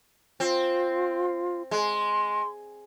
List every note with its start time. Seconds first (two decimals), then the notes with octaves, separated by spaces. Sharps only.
0.40 C4 F4
1.71 G#3 C6